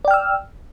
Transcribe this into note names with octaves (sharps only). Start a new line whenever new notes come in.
D5 G5 E6 F6